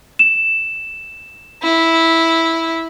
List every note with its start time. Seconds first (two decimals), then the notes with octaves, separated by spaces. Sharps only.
0.19 E7
1.63 E4